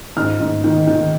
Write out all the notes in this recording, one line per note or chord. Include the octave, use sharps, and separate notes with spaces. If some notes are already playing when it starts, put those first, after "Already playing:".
G#2 F6
G#2
D#3
D#3